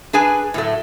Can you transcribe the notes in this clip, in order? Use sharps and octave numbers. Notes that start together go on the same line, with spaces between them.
D4 G#4 B4 G#5
A2 F#3 A3